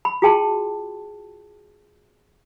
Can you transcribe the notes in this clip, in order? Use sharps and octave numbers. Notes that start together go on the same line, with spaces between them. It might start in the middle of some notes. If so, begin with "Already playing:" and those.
B5
F4 F#4 G#4 G5 A5 C6